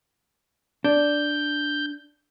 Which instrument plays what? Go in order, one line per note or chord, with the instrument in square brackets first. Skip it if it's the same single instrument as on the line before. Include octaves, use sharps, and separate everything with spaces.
[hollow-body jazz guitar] D4 [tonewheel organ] G6